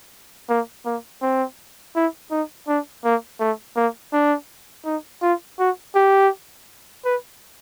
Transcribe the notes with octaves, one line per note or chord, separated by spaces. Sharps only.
A#3
A#3
C4
E4
D#4
D4
A#3
A3
A#3
D4
D#4
F4
F#4
G4
B4